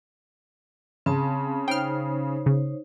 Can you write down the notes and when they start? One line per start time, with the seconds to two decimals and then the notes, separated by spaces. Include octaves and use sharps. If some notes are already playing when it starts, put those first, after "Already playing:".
1.06 C#3 C4 A5
1.68 D#4 C5 C#5 G5 F6
2.46 C#3